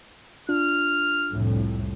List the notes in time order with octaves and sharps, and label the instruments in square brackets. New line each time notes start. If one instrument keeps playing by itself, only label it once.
[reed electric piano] D4 F4 [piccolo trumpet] F6
[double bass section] C2 F2 A2